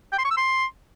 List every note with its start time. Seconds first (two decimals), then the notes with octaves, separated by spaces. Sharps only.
0.12 G5
0.18 C6
0.25 C#6
0.31 E6
0.37 C6